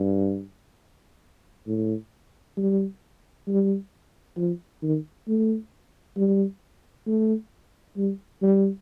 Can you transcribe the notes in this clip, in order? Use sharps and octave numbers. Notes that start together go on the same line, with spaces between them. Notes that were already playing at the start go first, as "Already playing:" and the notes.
Already playing: G2
A2
G3
G3
F3
D#3
A3
G3
A3
G3
G3